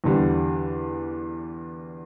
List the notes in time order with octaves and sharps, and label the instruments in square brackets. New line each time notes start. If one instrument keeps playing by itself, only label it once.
[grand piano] E2 D3 G3